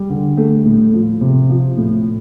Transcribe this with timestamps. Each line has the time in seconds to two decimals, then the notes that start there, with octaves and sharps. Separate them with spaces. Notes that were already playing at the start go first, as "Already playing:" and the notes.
Already playing: G3
0.10 D3
0.37 A3
0.65 A2
0.93 F3
1.21 C3
1.50 F3
1.77 A2